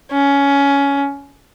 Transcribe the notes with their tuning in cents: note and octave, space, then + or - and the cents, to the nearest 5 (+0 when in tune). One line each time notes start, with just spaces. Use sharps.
C#4 +15